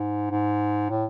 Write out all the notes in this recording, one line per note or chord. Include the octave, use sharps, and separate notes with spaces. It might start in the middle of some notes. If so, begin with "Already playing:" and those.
Already playing: G#2
G#2
A2